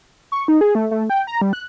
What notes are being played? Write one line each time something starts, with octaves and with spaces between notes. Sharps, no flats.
C#6
D#4
G#4
A3
A3
G5
A#5
G3
F#6